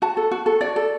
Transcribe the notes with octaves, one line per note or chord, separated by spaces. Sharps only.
F#4 A5
A4
F#4
A4
F#4 D5
A4